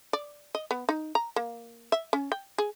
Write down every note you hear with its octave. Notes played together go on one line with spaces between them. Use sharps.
D5
D#5
B3
D#4
A#5
A#3
E5
C#4
G5
G#4